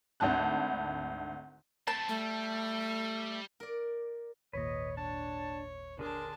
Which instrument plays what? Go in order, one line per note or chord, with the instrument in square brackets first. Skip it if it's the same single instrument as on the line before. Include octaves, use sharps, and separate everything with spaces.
[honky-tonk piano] G#1 D2 D3 A5 F#6
[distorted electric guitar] A3 C4 [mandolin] A5
[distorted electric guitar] G3 [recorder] A3
[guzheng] A#4 D5
[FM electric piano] G#1 D#2 A#2 [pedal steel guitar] B4 D#5 [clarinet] C#5
[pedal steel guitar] D4 [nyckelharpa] C#5 [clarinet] A5
[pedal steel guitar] D3 G#4 C6 [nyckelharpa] D4 A5 [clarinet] A#4